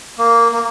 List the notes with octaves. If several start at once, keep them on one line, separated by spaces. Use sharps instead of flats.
A#3
A#3